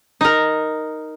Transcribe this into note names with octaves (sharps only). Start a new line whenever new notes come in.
D#4 A#4